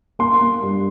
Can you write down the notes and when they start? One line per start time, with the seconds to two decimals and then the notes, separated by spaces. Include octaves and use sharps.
0.19 A#3 C6
0.41 A#3
0.62 G2